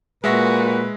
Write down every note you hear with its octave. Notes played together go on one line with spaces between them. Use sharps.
A#2 G#3 F#4 B4 E5 A#6